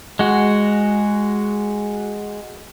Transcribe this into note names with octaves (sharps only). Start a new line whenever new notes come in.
G#3 F#4